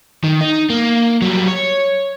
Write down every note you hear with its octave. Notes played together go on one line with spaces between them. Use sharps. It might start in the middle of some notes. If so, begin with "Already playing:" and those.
D#3
D#4
A#3
F#3 G3
C#5